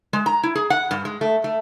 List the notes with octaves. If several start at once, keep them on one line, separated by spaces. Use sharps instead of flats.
G#3
A#5
E4
G#4
F#5
G2
G#3
A3
A3